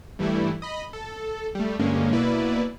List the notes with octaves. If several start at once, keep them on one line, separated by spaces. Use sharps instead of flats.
G2 E3 G3 A3 E4
D#5 B5
A4
G3 A3
G2 D3 G#3 A#3 C#4
B2 A#3 E4 B4 D5